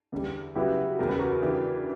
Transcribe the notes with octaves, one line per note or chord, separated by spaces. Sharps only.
E2 D3 G3
C#3 F#3 B3 E4 F#4 G4 B4
E2 C#3 G3 A#4
B4
F#4 A#4
C#3 E3 B3 D4 G4